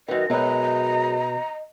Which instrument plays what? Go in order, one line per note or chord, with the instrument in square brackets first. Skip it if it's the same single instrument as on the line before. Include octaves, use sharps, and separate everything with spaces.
[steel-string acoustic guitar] F#2 D#3 [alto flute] B4 [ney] D#5
[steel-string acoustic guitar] F#2 G#3 [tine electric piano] B2 B4 [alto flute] D#5 [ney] A#5